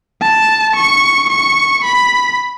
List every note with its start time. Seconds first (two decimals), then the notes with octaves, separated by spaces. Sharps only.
0.21 A5
0.76 C#6
1.30 C#6
1.84 B5